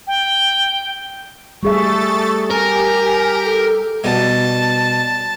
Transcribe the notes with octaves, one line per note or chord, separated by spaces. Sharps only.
G5
G3 A3 G#4 A4 E5 C#6 A6
G4 A#4 G#5
A4
B2 G3 A5